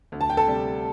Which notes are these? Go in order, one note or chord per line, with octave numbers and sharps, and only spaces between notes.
D2
A5
G5
A4 A5
C3 G3